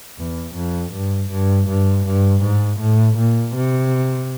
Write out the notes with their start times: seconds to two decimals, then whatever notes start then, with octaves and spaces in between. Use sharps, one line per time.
0.19 E2
0.56 F2
0.94 G2
1.30 G2
1.68 G2
2.06 G2
2.44 G#2
2.80 A2
3.18 A#2
3.56 C3